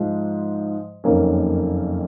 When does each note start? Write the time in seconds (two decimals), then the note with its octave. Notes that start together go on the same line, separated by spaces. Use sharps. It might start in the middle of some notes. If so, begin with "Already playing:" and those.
Already playing: G#2 F3 G#3
1.04 F#1 F2 D#3 A#3 C#4